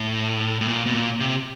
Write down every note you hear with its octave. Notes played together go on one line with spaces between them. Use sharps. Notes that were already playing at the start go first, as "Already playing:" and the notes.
Already playing: A2
A2
A#2
B2
A#2
C3